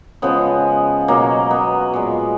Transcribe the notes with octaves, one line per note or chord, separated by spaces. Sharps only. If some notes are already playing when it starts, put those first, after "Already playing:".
C#3 F3 G#3 B3
B2 F#3 A#3
B3
A#2 G#3